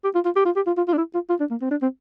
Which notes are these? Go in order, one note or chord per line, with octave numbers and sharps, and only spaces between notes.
G4
F4
F4
G4
F4
G4
F4
F4
F4
D4
E4
F4
F4
D4
A#3
C4
D4
C4